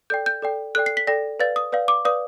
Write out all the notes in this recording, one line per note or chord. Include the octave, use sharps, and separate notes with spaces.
A4 D5 G5 G6
G6
A4 D5 G5
A4 D5 G5 F#6
C7
B6
A4 D5 G5 A#6
B4 D5 F5 A6
D#6
B4 D5 F5
D6
B4 D5 F5 D#6